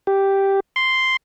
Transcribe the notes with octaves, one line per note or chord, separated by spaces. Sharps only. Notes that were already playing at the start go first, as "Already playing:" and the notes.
G4
C6